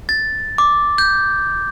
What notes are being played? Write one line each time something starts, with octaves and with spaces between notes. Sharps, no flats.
A6
D6
G6